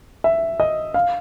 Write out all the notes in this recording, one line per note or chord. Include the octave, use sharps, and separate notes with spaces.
E5
D#5
F5